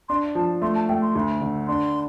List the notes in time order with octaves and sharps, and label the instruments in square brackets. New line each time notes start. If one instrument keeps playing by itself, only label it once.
[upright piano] D4 [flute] C6
[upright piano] F3 [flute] A5
[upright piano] A3 [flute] C6
[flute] A5
[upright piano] A3 [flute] G5
[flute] C6
[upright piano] D2
D3
[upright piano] D4 [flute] C6